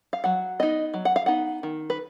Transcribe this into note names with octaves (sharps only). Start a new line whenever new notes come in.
F5
F#3 F#5
B3 D#4 D#5
F#3
F#5
F5
B3 D#4 F#5
D#3
B4